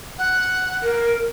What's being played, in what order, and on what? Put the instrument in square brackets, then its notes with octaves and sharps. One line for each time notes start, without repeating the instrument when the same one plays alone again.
[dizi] F#5
[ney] A#4